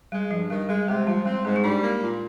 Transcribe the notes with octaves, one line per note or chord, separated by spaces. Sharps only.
G3 G#3
G2 F3
D#3 G3
G3 G#3
C3 G#3
F3 G3
G3 C4
G#2 G#3
D#4
G3 D4
A#3
A#2